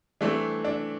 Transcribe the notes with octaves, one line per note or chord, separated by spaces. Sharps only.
E3 A3 C4 D4
D4